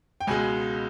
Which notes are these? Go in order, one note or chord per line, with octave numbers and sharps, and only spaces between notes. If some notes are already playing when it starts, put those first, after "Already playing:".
G5
C#2 B2 G#3 G#5